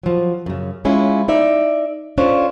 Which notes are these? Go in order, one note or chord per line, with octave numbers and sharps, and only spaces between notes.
F3 F#3
F#2 C#3
G#3 C#4 E4 F4
D#4 D5 E5
C#4 D4 F4 A4 C5 C#5